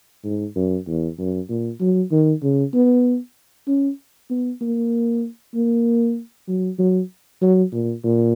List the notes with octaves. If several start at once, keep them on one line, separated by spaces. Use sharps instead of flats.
G#2
F#2
E2
F#2
A#2
F#3
D#3
C#3
B3
C#4
B3
A#3
A#3
F#3
F#3
F#3
A#2
A#2